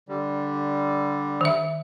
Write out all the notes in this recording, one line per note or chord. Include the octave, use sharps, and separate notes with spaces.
D3 G3
D#3 E5